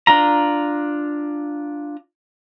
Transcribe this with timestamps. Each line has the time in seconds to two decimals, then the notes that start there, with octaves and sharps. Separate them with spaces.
0.07 D4 F4 A#5